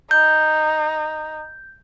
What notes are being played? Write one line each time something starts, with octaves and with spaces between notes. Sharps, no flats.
D#4 G6